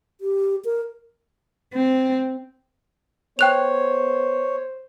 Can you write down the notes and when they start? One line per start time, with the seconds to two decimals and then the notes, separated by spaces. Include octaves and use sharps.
0.21 G4
0.65 A#4
1.74 C4
3.39 B3 C5 C#5 G5 F#6 F7